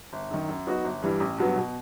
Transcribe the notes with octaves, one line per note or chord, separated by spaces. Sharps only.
G1
F#2 D#3
F#2
F#3 B3 D#4 F#4
G1
G2 E3 G3
A1
G2 F#3 B3
B2